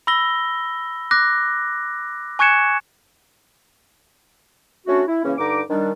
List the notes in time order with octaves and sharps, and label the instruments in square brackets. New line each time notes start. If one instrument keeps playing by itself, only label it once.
[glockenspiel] B5 E6 A#6 G7
D6 F#6 A#6
G#5 C#6 F#6 G#6 C#7 E7
[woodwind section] A3 C#4 D4 F#4
E4
C#3 E3 A#3 C#4
G2 D3 D#4 A#5 D6
D#3 G3 D4